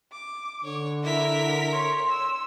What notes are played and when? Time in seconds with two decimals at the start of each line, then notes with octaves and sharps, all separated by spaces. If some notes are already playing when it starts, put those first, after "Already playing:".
0.12 D6
0.64 D3 C#5
1.03 E4 A#4 B6
1.72 C#5 C6
2.09 E6